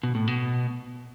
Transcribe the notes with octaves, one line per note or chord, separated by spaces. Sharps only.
B2
A2
B2